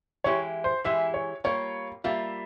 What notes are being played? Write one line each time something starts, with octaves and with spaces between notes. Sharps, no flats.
E3 G#3 E4 G4 C#5
C5
E3 G#3 E4 G4 E5
C#5
G3 A#3 F4 C#5
G3 A#3 F4 E5